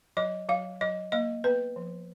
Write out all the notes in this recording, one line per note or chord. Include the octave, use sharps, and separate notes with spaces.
F#3 D#5
F#3 F5
F#3 D#5
A#3 D#5
B3 B4
F3